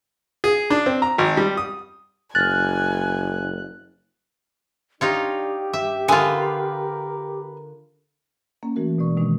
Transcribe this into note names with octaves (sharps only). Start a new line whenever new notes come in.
G#4
D4
C4
A#5
G#1
G3
D#6
F#1 G#5 F6 F#6 A6
D4 D#4 F4 G4 C#5
G2 E5
D3 F4 A#4 B4 G#5 D#6
A#3 C#4
E3 A3 F#4 A#4
B2 G#3 D5 C#6
B2 D#3 G#3 D4